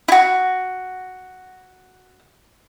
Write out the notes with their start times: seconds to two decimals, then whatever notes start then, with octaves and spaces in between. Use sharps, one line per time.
0.08 E4 F#4